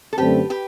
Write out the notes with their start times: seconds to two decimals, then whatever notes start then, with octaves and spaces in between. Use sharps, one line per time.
0.13 A4
0.18 F#2 D3 A3 C4 G4 B4
0.50 G4 B4